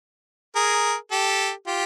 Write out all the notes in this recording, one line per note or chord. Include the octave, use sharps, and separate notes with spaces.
G#4 A#4
G4 A4
F4 G4